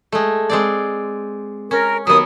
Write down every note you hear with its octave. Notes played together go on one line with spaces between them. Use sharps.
G#3 A3
G#3 C4 D5
C#4 A#4
D#2 D#3 F#3 B3 D#6